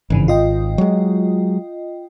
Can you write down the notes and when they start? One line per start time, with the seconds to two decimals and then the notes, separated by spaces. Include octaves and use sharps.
0.10 G#1 G2 C#3 E3
0.28 F4 D#5 G5
0.78 F#3 G#3